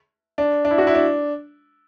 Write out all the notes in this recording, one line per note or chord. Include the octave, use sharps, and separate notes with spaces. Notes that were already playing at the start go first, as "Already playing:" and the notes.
D4
D4
E4
F#4
E4
D4